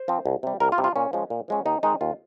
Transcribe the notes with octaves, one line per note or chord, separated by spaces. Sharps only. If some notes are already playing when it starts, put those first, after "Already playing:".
Already playing: C5
F3 C4
C2
C3 G3
C2 A#4
F4
C3 G3
F4
A#2 C#4
F3 G#3 C#4
A#2
F3 G#3 C#4
D#2 D#4
D#3 G#3 C4 D#4
D#2 F4